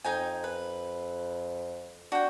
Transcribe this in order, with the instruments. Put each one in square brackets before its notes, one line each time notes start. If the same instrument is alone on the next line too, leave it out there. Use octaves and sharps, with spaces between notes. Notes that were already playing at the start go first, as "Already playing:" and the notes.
[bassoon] F2 [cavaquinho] D#4 G5 G#5
[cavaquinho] B4
[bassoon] D4 [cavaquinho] F#4 G5